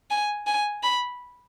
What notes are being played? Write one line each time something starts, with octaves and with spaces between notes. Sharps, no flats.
G#5
G#5
B5